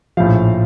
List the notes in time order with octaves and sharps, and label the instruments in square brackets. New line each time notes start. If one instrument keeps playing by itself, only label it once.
[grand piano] A#1 A2 F3 F5